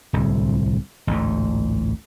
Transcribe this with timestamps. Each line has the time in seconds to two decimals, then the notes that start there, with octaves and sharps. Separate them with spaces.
0.13 D1 C2
1.07 A1 D2 G#2